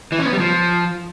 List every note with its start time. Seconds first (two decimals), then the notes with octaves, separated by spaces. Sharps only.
0.12 E3
0.19 C#4
0.26 B3
0.33 G3
0.40 F3